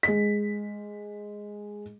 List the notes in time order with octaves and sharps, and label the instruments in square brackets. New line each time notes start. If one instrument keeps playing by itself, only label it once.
[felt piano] G#3 B6